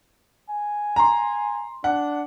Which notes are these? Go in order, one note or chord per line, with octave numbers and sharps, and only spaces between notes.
G#5
A#5 C6
D4 F#5